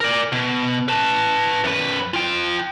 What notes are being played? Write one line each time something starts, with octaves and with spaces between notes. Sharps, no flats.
A#4 D5
B2
B4 A5
F#2 B4
F4 G5